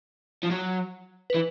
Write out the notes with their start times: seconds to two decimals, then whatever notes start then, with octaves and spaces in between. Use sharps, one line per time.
0.43 F3
0.51 F#3
1.30 B4
1.34 E3